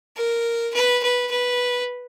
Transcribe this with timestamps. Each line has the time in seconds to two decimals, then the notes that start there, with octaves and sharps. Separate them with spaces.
0.17 A#4
0.74 B4
1.03 B4
1.31 B4